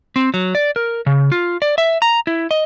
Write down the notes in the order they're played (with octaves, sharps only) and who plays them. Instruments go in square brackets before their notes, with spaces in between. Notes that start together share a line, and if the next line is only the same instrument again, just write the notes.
[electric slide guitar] C4
F#3
D5
A#4
C#3
F4
D5
E5
A#5
E4
D#5